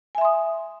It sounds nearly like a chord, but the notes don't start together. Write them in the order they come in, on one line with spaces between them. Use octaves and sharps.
G#5 E5 C6 D#6